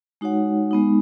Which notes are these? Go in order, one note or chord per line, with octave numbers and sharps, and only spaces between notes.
G#3 D#4 F#4 C#5 F#5
G#3 B3 D#4